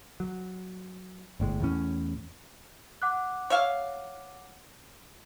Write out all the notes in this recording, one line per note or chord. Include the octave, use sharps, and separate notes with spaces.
F#3
G1 A2 G#3
E2 A2 C#4
F#5 D6 F#6
C#5 E5 F5